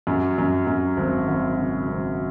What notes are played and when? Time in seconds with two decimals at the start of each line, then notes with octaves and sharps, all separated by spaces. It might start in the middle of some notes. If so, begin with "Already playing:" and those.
0.07 F#2
0.38 F#2
0.67 F#2
0.97 G#1
1.28 G#1
1.57 C#3
1.88 G#1